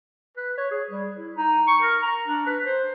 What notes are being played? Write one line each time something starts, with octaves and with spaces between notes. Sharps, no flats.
B4
C#5
G#4
G3
E4
D#4
C#6
A#4
A#5
D4
B4
C5